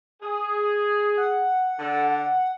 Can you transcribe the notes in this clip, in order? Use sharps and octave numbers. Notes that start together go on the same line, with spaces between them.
G#4
F#5
D3 A4